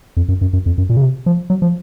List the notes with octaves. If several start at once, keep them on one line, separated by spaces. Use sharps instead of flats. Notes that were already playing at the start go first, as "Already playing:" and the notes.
F2
F#2
F#2
F#2
F2
F#2
A#2
C#3
C3
F3
F#3
F3